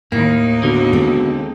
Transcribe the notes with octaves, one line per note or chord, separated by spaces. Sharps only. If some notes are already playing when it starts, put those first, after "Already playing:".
D#2 A2 D#3 A#3 D#4
B2 D3
G#3 C4 A4